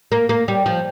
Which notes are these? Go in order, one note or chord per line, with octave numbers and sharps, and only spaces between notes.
A#3
A#3
G3
F3